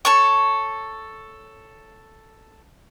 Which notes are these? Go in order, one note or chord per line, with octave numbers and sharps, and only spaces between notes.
A4 C#5 C#6